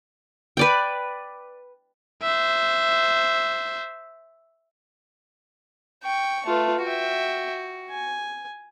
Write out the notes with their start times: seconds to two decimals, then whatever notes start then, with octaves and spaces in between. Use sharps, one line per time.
0.57 B4 D5 G5
2.22 C5 E5
6.04 G5 C#6
6.46 A3 F4 B4
6.84 F#4 E5 G5
7.90 G#5